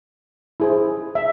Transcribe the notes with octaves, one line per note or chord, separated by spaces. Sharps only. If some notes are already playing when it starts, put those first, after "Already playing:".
E4 G#4 C5
E5